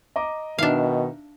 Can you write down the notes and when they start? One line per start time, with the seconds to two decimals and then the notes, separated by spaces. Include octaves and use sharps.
0.16 D#5 A#5 D6
0.59 B2 D#3 D4 D#4 E5 F5